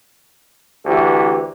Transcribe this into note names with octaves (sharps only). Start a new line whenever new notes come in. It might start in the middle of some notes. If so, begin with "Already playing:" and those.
D2 E3 G4